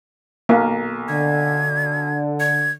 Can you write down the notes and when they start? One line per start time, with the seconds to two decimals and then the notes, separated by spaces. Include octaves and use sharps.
0.49 B1 A#3
1.08 D3 G#6
2.40 G#6